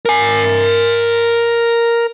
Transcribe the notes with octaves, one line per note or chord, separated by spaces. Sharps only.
A#4 G#5